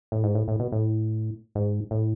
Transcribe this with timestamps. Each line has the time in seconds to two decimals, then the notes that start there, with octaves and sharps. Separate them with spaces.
0.12 A2
0.23 G#2
0.35 A2
0.48 A2
0.59 B2
0.72 A2
1.55 G#2
1.91 A2